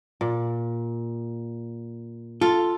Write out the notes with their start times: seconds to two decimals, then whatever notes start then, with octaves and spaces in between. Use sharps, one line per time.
0.21 A#2
2.41 F4 A4